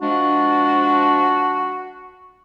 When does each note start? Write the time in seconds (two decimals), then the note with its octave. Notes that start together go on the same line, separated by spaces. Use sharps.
0.01 F3 G#3 D4 F#4